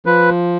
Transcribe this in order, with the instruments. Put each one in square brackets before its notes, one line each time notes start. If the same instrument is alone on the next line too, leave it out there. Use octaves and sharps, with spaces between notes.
[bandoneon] F3 B4